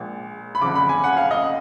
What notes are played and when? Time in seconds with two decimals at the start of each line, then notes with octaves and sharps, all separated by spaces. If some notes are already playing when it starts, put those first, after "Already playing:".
Already playing: A#1 A#2 G#3
0.55 B5
0.61 F#1 F2 D3 D6
0.75 B5
0.89 G#5
1.04 F#5
1.17 F5
1.31 D#5